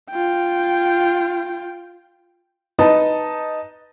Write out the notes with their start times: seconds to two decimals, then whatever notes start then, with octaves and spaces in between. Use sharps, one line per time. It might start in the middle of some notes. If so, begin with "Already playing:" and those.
0.11 F4 G5
2.79 D#4 B4 D#5 A5